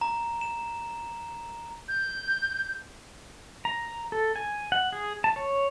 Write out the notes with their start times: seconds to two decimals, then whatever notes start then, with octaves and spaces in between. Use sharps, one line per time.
0.01 A#5
0.41 E7
1.88 G6
3.65 A#5
4.12 A4
4.36 G#5
4.72 F#5
4.93 G#4
5.24 A5
5.36 C#5